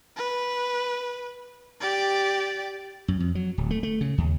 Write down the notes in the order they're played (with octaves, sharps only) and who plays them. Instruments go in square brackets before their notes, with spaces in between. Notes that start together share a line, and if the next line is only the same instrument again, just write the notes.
[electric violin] B4
G4 D5
[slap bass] F#2
F2
F#3
D1
A3
A3
C#3
D#2